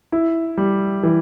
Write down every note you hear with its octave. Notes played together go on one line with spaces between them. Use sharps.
E4
G3
E3